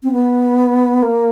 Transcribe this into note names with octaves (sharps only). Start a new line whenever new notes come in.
C4
B3
A#3